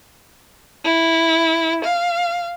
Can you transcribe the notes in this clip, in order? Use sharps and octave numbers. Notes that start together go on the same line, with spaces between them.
E4
F5